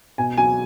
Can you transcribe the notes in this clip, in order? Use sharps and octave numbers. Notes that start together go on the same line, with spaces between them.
B2 G#5
F#3 G#5